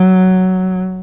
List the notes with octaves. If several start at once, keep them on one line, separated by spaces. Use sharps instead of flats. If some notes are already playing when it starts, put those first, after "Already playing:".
Already playing: F#3